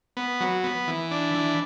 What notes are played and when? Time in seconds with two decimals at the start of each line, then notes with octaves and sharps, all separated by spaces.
0.17 B3
0.41 F#3
0.64 B3
0.87 E3
1.11 D4
1.35 E3